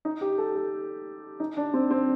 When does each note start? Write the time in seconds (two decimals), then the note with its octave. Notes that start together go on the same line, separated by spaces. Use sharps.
0.05 D#4
0.21 G4
0.38 A4
0.56 A4
1.40 D#4
1.57 D4
1.74 C4
1.91 C4